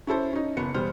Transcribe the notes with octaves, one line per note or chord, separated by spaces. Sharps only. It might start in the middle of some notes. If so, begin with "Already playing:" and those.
C#4 E4 A4 C5
C#4 D#4
F#1 B3 C#7
E1 G3 B3 C5 F6